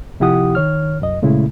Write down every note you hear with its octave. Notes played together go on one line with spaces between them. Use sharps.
C3 F3 E4 G4 F#5 D#6
D#3 C#5 F6
C2 F#2 D#5
A#2 C#3 G#3 A3 E4